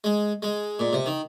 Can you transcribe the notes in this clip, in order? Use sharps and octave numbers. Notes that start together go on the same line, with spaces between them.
G#3
G#3
A#2
C3
D#3